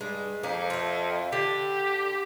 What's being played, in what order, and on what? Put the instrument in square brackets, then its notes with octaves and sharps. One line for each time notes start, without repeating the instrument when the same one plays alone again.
[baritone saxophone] G2 [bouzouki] G#3
[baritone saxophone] F2 [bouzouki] A#3
[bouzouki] A3 F4
[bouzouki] D3 [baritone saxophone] G4